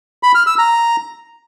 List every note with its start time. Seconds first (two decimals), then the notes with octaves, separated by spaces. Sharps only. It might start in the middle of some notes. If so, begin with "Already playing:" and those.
0.23 B5
0.35 F6
0.47 E6
0.59 A#5